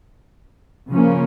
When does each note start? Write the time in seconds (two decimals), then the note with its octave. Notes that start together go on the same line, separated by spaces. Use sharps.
0.91 C#3 F3 A#3 C#4